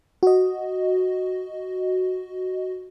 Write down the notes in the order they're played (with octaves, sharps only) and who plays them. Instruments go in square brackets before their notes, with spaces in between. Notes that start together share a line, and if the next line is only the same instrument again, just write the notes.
[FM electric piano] F#4 D#5